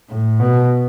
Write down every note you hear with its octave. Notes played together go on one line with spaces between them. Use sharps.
A2
B2